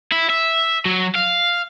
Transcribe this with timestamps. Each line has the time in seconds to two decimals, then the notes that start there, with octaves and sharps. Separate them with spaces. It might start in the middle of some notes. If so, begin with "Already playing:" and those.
0.12 E4
0.30 E5
0.86 F#3
1.15 F5